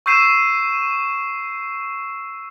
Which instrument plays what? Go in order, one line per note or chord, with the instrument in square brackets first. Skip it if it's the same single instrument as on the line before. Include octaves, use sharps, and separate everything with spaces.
[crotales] C#6 E6 G6 C7 D#7 E7